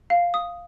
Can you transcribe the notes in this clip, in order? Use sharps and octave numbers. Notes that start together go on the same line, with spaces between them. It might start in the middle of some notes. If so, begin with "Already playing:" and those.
F5
D#6